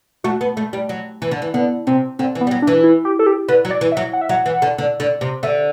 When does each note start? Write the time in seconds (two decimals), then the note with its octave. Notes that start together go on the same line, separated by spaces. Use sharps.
0.24 A3 F#4
0.41 B3
0.57 A3
0.73 G3
0.89 F#3
1.22 E3
1.31 D3
1.42 E3
1.54 D3 B3
1.87 C3 C4
2.19 D3 C4
2.35 E3
2.41 B3
2.47 G3
2.51 F#3
2.62 D4
2.67 E3
2.84 E4
3.05 G4
3.19 A4
3.26 G4
3.48 D3 B4
3.65 F#3
3.70 D5
3.81 E3
3.92 E5
3.97 F#3
4.13 F#5
4.21 E5
4.29 F#3 F#5
4.46 E3
4.62 D3
4.78 D3
5.00 D3
5.21 C3
5.43 D3 E5